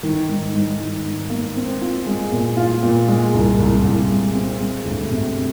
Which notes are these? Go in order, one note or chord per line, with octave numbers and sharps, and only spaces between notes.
D#3
G#2
G#2
D#3
G#2
A#3
C4
F4
G#3
A#2
F4
A#2
G#3
C2
C2
C2
G#3
C4
G#3
D2
C3